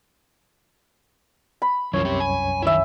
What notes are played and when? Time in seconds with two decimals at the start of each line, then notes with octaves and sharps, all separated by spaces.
1.62 B5
1.93 C2 F#2 E3 F4 C#5
2.05 C4 G4
2.20 G#5
2.62 D#3 E4 E5 G#5